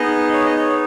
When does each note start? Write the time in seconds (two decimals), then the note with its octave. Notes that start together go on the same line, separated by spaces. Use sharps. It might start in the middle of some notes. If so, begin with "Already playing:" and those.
Already playing: B3 D#4 G#4 D#5
0.33 C#5
0.46 D#5
0.57 C#5